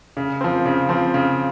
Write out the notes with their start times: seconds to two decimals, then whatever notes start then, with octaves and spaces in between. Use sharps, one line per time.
0.17 C#3
0.41 F3 C4
0.66 C#3
0.89 F3 C4
1.14 C#3